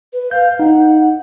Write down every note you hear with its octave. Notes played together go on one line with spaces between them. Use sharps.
B4
F5 G6
D#4 F#5